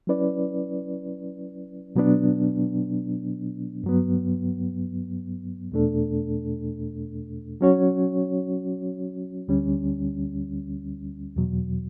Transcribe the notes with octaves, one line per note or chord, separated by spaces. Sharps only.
F#3 C#4 E4 B4 D5
B2 F#3 B3 D4
G2 F#3 B3
E2 B2 A3 D4 A4
F#3 C#4 F#4 C#5
D2 D3 G3 C#4
E2 B2 F#3